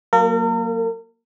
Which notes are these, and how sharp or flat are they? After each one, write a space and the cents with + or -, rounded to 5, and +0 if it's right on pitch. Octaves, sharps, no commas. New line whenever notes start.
F#3 +0 A#3 +0 A#4 -40